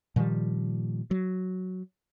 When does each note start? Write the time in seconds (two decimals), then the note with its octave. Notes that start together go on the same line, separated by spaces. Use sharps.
0.16 A#2 D#3 F3 G3
1.11 F#3